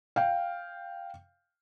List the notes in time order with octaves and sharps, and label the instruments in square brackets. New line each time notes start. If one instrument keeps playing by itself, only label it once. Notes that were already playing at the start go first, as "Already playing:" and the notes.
[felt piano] F5 G5